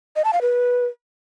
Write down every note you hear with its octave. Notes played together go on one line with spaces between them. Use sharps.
D#5
A5
F5
B4